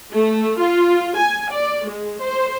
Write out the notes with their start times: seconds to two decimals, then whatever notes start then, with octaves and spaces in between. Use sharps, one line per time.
0.12 A3
0.61 F4
1.18 G#5
1.53 D5
1.88 G#3
2.22 C5